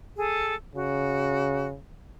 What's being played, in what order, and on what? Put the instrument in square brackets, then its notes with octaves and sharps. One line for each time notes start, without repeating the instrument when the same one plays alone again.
[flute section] G#4 A4
[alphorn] C#3 [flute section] F#4